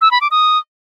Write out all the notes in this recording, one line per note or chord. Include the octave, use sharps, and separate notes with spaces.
E6
B5
D6
D#6